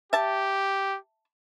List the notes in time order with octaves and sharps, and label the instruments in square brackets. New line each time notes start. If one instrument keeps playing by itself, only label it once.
[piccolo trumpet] G4 [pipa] E5 A5